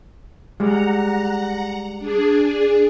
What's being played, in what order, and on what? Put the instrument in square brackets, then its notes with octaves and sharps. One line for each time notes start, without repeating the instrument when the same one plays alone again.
[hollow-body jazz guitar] G3 G#3 [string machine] F#5 A#5
[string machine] D4 G#4